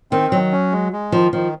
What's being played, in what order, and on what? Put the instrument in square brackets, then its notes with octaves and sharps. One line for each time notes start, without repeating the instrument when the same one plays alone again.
[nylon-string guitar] D#3 [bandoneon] C4
[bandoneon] D#3 [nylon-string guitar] F#3
[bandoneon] C#4
G#3
G#3
[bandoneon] D#3 [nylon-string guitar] F3
[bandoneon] D#3 [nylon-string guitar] F3